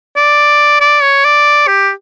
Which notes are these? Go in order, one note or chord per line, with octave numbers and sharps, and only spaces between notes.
D5
D5
C#5
D5
G4